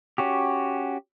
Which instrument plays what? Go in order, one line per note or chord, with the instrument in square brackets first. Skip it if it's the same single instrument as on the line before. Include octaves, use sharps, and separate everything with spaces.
[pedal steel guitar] C#4 F#4 G4